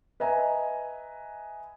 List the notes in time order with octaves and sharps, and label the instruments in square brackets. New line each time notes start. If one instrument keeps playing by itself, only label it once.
[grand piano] B4 D#5 E5 G#5 A#5